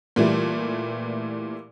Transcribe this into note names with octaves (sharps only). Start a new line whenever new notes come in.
A#2 E3 G3 A3